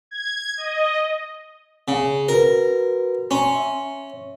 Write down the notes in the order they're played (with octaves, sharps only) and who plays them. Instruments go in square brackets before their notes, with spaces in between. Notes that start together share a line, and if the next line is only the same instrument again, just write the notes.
[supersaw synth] G#6
D#5
[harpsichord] C#3
[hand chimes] F#4 B4 [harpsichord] A#4
[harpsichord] C#4 [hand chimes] A#5 C6
[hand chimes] E5